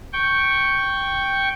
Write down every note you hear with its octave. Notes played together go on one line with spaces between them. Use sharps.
G5 C#6